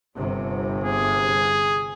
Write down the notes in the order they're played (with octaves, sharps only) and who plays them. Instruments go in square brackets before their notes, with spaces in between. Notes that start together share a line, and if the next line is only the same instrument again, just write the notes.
[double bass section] G1 C3
[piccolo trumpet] G#4